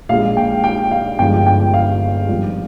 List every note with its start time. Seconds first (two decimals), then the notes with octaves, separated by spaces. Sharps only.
0.09 A#1 A#2 G#3 F5
0.37 G5
0.64 G5
0.91 F5
1.19 G1 G2 F3 G#3 G5
1.46 G5
1.74 F5
2.29 G#1 G2 F3